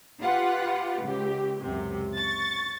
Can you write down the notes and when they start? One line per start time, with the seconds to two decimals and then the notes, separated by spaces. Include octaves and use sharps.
0.22 F4 G4 B4 F#5
1.04 C#2 G4
1.61 C#2 F#2 C3
2.16 C#6 A6